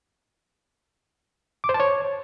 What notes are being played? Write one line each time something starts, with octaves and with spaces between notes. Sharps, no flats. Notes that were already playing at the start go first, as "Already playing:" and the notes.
D6
C5
A5
C#5